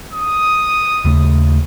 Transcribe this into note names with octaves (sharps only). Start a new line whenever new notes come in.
D#6
D#2 C#3 A3